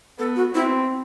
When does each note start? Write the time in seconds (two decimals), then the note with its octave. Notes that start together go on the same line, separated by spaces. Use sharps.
0.19 B3 A4
0.36 F#4
0.55 C4 E4